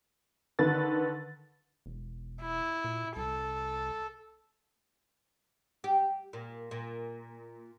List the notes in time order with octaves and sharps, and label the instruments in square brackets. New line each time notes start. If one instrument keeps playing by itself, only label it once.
[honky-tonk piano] D3 D#3 B4 A6
[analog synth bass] E1
[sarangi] E4
[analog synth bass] A#2
[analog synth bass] C2 [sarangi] A4
[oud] G4
A#2
A#2